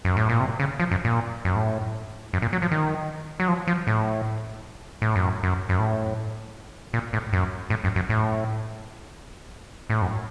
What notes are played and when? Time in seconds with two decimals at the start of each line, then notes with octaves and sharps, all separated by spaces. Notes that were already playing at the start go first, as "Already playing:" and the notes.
0.05 F#2
0.17 A2
0.29 A#2
0.40 C3
0.60 C#3
0.80 F3
0.91 F#2
1.05 A#2
1.45 F#2
1.55 A2
2.33 F#2
2.42 A#2
2.53 F#3
2.62 F3
2.71 D#3
3.40 F#3
3.48 F3
3.67 F3
3.87 A2
5.02 A2
5.16 F#2
5.43 F#2
5.69 F#2
5.79 A2
6.93 A#2
7.13 A2
7.33 F#2
7.70 A2
7.84 F#2
7.96 F#2
8.10 A2
9.90 A2
10.02 F#2